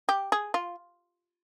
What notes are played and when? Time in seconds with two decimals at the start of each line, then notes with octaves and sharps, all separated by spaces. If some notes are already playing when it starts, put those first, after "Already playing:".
0.09 G4
0.32 G#4
0.54 F4